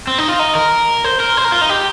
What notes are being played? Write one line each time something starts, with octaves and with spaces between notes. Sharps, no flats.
C4
D#4
F4
D#4
A#4
C5
A#4
C5
A#4
F4
D#4
G4